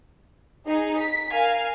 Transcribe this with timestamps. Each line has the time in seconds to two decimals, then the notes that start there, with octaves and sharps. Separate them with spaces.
0.66 D#4 G#4
0.99 B6
1.31 A#4 F5 G#5